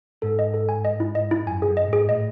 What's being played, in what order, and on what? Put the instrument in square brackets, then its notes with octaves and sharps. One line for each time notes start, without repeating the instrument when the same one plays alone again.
[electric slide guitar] G#2 [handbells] A4
[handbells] D#5
A4
G#5
D#5
E4
D#5
E4
[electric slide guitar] F#2 [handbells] G#5
[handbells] G#4
[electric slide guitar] F#2
[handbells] D#5
[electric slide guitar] G#2
[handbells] G#4
[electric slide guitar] A2 [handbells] D#5